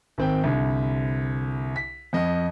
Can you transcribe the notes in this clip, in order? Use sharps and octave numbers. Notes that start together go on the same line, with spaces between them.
G#1 C4 G5
C2 D3
B6
F2 D#5